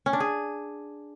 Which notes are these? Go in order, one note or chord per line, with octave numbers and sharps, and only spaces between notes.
C#4
D4
G#4